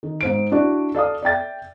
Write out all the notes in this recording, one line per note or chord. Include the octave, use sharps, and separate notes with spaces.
D#3
G#2 C5 D7
D4 E4 F#4 D5
A4 D5 F5 D#6
D5 E5 G5 A6